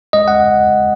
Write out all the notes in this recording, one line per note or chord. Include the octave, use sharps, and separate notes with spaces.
G#3 D#5
F#5